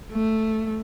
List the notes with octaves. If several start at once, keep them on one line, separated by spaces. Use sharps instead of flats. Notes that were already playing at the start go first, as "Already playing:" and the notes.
A3